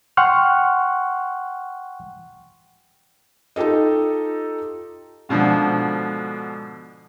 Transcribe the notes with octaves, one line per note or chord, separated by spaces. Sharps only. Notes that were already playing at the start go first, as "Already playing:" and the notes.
F#5 G5 C6 C#6 F6 F#6
D#4 F4 G4 A4 D#5
G#2 B2 D3 F3